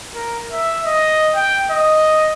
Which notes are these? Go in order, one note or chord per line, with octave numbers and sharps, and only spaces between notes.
A#4
E5
D#5
G5
D#5